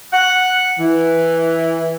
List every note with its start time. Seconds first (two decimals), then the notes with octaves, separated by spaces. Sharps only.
0.13 F#5
0.79 E3